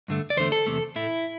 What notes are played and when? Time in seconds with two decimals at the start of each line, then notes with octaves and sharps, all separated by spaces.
0.08 G2 D3 A3
0.30 D5
0.37 E2 D3 A3 C5
0.52 A4
0.66 E2 C3 A3
0.96 A2 A3 E4